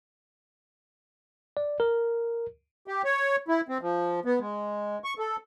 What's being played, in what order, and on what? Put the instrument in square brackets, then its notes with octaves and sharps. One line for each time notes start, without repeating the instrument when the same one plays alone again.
[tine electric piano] D5
A#4
[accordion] G4
C#5
E4
C4
F3
B3
G#3
C#6
A4